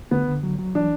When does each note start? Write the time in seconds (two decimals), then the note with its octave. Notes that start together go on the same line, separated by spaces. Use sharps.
0.11 D3 B3
0.28 D3
0.43 F#3
0.59 F#3
0.75 E3 D4